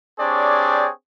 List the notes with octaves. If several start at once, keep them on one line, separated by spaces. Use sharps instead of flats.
C4 D4 G4 G#4 C#5 D5